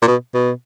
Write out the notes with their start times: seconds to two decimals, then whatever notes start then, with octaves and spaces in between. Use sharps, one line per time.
0.02 A#2
0.07 B2
0.34 B2